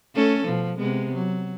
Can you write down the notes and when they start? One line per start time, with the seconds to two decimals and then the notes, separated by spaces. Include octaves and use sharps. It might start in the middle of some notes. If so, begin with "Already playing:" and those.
0.14 A3 C#4 A4
0.45 B2 F3
0.77 C3 G#3 B3
1.14 F#3